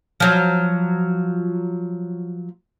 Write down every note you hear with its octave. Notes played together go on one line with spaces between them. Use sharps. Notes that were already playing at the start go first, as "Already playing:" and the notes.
F3 F#3